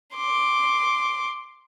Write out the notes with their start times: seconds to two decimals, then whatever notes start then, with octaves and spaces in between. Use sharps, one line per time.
0.16 C6 D6